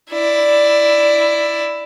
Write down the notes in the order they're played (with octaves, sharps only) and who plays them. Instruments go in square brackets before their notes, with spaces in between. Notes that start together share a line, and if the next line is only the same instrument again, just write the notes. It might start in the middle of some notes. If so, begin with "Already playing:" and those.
[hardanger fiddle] E4 D5